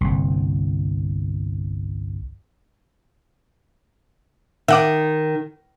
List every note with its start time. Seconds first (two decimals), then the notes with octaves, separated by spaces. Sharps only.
0.01 G1 C2
4.68 D#3 E5 F#5 D6